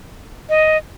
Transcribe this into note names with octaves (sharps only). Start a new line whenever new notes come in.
D#5